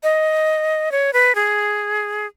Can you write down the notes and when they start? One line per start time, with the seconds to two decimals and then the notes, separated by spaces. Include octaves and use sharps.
0.03 D#5
0.92 C#5
1.13 B4
1.35 G#4